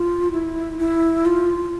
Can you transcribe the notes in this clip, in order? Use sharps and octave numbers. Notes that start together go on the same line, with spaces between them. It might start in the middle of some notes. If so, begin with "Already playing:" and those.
Already playing: F4
E4
E4
F4